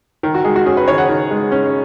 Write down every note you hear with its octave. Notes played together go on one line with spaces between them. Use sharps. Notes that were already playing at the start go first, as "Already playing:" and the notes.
D#3
F#4
G#3 G#4
F#4
C#4 G#4
B4
D#3 C#5
F#5
D#3
G#3
C#4